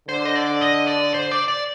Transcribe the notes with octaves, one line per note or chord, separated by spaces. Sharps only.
D3 C5
D#5
D5
D#5
D5
C5
D5
D5